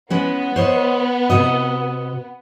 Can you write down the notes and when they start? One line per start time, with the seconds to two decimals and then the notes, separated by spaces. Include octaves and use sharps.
0.10 G#3 B3 C#4 B4
0.56 C5 C#5 D#5
1.30 C3 F#4 D#5